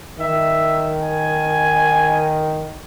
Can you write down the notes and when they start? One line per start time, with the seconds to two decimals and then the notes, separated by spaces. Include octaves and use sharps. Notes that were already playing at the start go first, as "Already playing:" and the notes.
0.20 D#3 E5
1.03 G#5